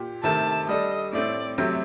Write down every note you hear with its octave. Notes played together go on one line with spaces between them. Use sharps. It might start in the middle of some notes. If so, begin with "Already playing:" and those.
Already playing: A#2 G4
C3 D#3 A3 A5
G3 D4 A4 D#5
A2 A3 C4 D5
C3 F#3 A3 C4